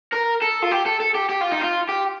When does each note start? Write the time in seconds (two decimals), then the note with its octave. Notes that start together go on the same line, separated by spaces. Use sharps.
0.12 A#4
0.42 A4
0.62 F4
0.71 G4
0.86 A4
1.00 A4
1.15 G4
1.30 G4
1.41 F4
1.52 D#4
1.61 F4
1.89 G4